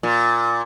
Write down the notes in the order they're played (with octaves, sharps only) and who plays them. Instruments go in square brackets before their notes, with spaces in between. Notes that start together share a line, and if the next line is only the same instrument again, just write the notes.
[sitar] A#2